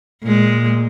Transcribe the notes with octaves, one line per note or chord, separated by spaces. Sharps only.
A#2 G#3